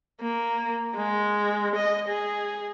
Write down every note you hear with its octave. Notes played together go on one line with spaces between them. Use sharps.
A#3
G#3
D#5
G#4